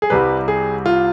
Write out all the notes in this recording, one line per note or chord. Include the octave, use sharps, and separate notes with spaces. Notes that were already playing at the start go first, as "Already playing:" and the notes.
G#4
C2 C3 G3 B4
G#4
F4